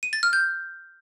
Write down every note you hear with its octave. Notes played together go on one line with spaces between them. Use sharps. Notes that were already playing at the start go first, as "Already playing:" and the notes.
D#7
A6
F6
G6